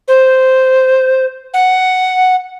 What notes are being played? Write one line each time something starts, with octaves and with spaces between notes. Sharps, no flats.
C5
F#5